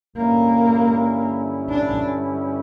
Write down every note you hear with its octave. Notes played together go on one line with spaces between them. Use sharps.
G2 D3 G3 A#3 C#4 E4
D4